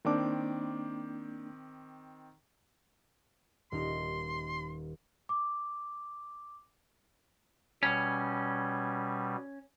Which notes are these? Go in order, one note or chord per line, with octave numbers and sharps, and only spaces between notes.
D#3 A#3 C4 D4 D6
D#1 D#4 C6
D6
B2 G3 C#4